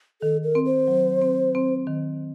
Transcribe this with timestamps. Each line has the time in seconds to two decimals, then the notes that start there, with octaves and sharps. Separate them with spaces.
0.22 D#3 A4
0.44 A#4
0.55 C4
0.66 C5
0.88 F#3
1.22 C4
1.55 C4
1.87 D#3